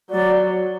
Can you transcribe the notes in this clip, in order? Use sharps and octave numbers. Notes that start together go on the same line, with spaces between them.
F#3 D5